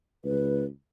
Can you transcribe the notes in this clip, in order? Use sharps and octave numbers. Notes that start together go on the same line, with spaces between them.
C#2 B4